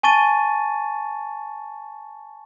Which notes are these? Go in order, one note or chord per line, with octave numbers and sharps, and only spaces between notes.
G#5 A5 C#6 A6 D#7